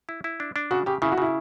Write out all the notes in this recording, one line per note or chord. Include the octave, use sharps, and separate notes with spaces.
E4
E4
D4
D4
C#3 F#4
C#3 G4
C#3 E4
F#4
C#3 E4